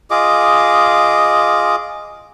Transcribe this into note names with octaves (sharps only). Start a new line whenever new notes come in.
F4 G#4 D#5 D6